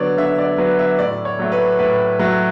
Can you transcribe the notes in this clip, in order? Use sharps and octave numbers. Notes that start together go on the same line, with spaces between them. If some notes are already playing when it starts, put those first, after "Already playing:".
Already playing: D3 F#3 B3 C#5 D5
D3 E5
D5
F#3 B3 B4
E5
A2 D5
C#5
F#3 A3
B4
A2 B4
F#3 A3